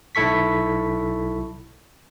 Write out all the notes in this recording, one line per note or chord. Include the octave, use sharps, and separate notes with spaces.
B1 E4 A4 C#6 B6